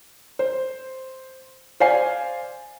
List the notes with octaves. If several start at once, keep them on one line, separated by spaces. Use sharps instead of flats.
C5
C5 D5 F5 G#5 C7